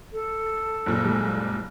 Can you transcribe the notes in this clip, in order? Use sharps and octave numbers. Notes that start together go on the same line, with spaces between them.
A4
F#1 A#2
G3 G#3